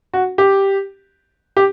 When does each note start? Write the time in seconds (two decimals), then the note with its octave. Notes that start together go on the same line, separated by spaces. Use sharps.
0.14 F#4
0.38 G4
1.57 G4